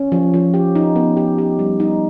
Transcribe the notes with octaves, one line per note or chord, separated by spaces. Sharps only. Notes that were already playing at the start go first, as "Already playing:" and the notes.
Already playing: C#4
F3
F3
G4
D#4
B3
G4
G4
G3
D#4